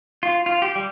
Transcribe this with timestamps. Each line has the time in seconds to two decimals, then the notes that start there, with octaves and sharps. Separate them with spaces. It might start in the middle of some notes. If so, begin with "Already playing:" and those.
0.23 F4
0.46 F4
0.62 G4
0.76 G3